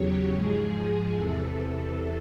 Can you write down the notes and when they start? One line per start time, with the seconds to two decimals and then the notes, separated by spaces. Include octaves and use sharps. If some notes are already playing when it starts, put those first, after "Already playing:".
Already playing: E2 C#3 F#3 G4 C#5
0.32 G#2 F3 G#3 G#4
1.14 E2 C3 E3 A4